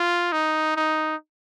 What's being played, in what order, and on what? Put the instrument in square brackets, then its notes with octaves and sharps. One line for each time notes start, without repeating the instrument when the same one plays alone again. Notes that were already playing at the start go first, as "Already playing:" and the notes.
Already playing: [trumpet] F4
D#4
D#4